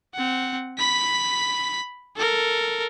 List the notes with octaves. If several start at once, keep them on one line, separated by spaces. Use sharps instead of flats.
C4 F#5
B5 B6
A4 A#4